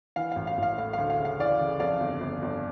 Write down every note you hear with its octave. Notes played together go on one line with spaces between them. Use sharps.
E3 F5
F5
A1
F5
A1 F5
A2 F5
F5
D2
F5
C#3
F5
E3 D5 F5
C#3
F2 D5 F5
G1
G1
G1